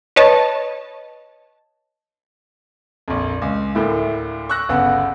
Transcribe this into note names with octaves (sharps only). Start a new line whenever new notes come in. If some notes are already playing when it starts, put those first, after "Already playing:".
B4 C#5 D#5 A5
A#1 F2
C#2
D2 A2 A#3 E4
C#6 E6 F#6 A#6
G1 C#3 B3 F#5 E6